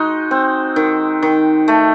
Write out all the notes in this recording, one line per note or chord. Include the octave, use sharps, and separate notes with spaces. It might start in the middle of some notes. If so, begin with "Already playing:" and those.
Already playing: G#3 D#4 F#4
C4
D#3
D#3
A3